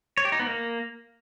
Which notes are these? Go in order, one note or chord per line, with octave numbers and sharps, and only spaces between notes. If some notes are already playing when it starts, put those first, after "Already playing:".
C#5
G4
D#4
B3
A#3